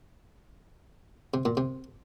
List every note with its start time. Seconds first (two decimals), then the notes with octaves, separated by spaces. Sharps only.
1.34 C3
1.45 A#2
1.57 C3